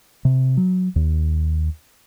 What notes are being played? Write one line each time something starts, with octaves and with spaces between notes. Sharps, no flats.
C3
F#3
D#2